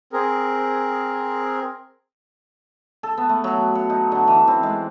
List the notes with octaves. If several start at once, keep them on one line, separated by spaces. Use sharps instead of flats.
C4 G#4 A#4
A4
B3
A3
F#3
F#5
D#4
D3
E3
C4
G#3